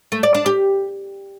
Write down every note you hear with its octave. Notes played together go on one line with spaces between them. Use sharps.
A3
D5
D4
G4